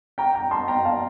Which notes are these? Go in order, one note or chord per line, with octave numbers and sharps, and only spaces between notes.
G5 A#5
G5 A#5
A5 C6
G5 A#5
F5 A5